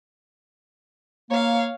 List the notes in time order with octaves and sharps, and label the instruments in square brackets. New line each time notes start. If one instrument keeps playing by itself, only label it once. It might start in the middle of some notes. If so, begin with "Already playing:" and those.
[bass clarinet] A#3 [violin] C#5 F5